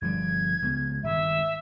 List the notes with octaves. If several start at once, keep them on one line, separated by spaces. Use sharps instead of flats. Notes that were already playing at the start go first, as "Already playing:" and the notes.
G1 F3 G3 G#6
C#2 B3
G#1 G2 E5